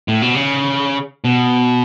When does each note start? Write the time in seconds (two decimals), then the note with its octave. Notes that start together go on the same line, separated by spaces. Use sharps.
0.08 A2
0.22 B2
0.35 C#3
1.25 B2